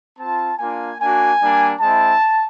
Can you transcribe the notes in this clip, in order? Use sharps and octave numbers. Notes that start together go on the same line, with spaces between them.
C4 F4 A5
A#3 D4 F4 G#5
A#3 D4 F#4 G#5
G3 A#3 D4
G#3 C4 E4 A5